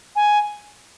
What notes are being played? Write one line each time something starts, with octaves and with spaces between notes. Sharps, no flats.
G#5